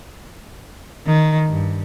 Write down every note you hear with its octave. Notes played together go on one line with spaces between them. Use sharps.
D#3
G2